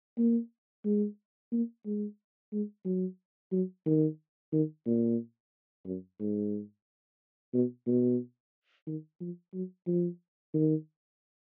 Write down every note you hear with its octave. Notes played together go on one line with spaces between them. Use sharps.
A#3
G#3
A#3
G#3
G#3
F#3
F#3
D#3
D#3
A#2
F#2
G#2
B2
B2
D#3
F3
F#3
F3
D#3